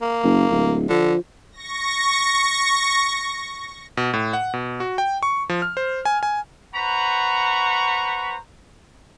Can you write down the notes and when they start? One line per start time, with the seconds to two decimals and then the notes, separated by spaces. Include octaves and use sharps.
0.02 A#3
0.24 F#1
0.50 D1
0.89 D3 F3
1.52 C#6 A#6
3.97 B2
4.14 A2
4.33 F#5
4.54 B2
4.80 F#4
4.98 G5
5.23 C#6
5.49 F3
5.62 F6
5.77 C5
6.05 G#5
6.23 G#5
6.75 B4 C5 F#5 A#5 B5 C#6